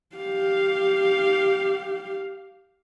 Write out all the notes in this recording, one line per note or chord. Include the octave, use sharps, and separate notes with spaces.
G4 F5